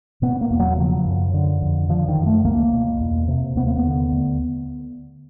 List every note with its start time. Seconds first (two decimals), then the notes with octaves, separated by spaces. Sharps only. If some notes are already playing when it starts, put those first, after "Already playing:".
0.22 B2 B3
0.41 A#3
0.51 E2
0.59 F#3
0.78 C#3 F3
1.05 F#2
1.34 D3
1.62 F2
1.89 D3 F3
2.08 D#3
2.18 F#2
2.26 A3
2.45 C#2 A#3
2.73 B2
3.00 E2
3.28 C3
3.56 D#2 B3
3.67 A#3
3.76 B3
3.84 D3
4.12 D2